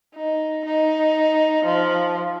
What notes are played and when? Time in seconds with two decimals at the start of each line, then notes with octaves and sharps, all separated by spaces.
0.14 D#4
0.65 D#4
1.65 F3